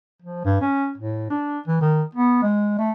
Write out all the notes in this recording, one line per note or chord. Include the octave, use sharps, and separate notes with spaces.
F3
G2
C#4
A2
D4
E3
D#3
B3
G#3
A3